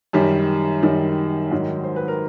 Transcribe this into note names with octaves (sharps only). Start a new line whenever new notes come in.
F#2 D#3 G3 G4
F#2 D#3 G3
G#2 D#3 F#3
C5
B4
A#4